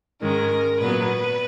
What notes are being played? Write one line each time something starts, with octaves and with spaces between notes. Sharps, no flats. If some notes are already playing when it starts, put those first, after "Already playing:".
G#2 D#3 G#3 C#4 A#4
A#2 F#3 B3 B4